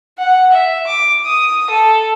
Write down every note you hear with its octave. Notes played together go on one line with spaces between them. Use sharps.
F#5
E5
D6
D#6
A4